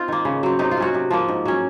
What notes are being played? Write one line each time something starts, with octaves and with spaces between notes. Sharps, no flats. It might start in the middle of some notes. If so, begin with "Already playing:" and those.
Already playing: C4 D#4 F4
D#3 A#3
C#3
F#3 C4
C3 D#4
F4
F#3 C#4 F#4
C3
F3 A#3
G#2
F#3 C#4